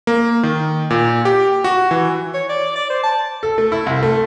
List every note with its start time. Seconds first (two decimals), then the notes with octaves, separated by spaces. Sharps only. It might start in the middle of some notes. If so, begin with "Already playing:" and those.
0.07 A#3
0.43 D#3
0.90 A#2
1.25 G4
1.64 F#4
1.91 E3
2.34 C#5
2.49 D5
2.75 D5
2.90 C5
3.03 A5
3.43 A4
3.58 A3
3.72 E4
3.86 C2
4.03 A3